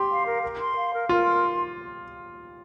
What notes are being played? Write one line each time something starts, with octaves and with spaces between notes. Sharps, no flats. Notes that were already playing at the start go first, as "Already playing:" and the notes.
Already playing: G4 C6
F5
A#4
A#4
C6
F5
A#4
F4 A#4
C6